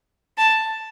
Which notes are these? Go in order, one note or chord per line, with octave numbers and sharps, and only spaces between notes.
A5